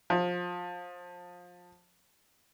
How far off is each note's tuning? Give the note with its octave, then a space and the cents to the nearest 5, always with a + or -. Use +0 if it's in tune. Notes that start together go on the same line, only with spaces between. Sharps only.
F3 +25